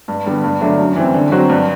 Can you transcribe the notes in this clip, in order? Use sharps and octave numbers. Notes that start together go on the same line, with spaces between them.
G2
D3 G3 B3
G2
D3 F#3 A3 D4
F#2
E3 G3 C4
D3
F#3 C4 F#4
G2